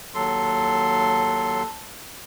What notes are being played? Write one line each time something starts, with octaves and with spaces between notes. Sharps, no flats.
D#2 F#3 A4 C6